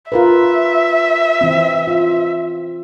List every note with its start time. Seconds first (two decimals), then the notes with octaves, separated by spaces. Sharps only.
0.12 F4 A#4 B4 E5
1.41 E3 C4
1.87 F4